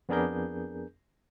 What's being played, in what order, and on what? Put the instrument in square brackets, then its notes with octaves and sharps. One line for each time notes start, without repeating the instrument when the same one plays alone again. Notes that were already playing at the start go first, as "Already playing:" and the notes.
[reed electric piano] F2 B3 D4 G#4 A#4 G6